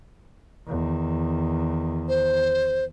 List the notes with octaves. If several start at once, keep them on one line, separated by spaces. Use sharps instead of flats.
E2 D#3
C5